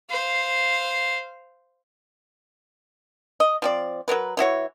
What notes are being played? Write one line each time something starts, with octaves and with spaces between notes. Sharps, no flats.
C5 F5
D#5
F3 C4 D5
F#3 B3 A#4 B4
E3 E4 F#4 C#5